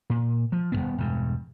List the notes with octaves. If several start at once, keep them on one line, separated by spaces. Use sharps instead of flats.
A#2
F3
D#1 E2 B3
E1 G2